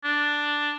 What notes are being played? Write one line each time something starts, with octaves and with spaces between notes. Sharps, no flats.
D4